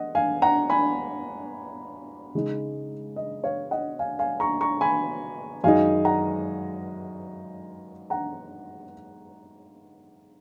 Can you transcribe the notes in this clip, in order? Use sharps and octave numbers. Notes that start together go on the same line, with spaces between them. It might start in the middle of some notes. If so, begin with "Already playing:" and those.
Already playing: D#5 F#5
F5 G#5
F#5 A#5
G#5 B5
C#3 G#3 D#4
D#5
C#5 F5
D#5 F#5
F5 G#5
F5 G#5
A#5 C#6
A#5 C#6
G#5 B5
F#2 D#3 G#3 D#4 F5 G#5
F#5 A#5
F#5 A#5